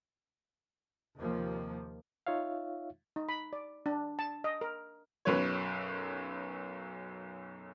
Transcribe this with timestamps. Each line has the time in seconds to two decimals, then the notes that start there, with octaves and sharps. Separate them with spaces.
1.19 D#2 C3 F3 A#3
2.27 D#4 F4 C#5 E5 F5
3.16 D#4
3.29 B5
3.53 D5
3.86 D4
4.19 A5
4.44 D#5
4.61 A#4
5.25 B1 F#2 B4 C#5